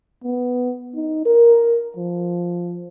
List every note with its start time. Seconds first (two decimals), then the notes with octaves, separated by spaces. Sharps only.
0.24 B3
0.95 D#4
1.25 A#4
1.96 F3